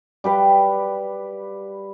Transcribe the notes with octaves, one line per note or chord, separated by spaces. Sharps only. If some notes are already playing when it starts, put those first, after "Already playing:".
G3 G4 B4 F5